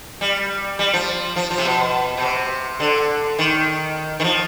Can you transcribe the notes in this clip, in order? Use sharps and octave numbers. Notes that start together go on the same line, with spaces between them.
G3
G3
F3
F3
F3
C3
B2
B2
C3
D3
D#3
D#3
F3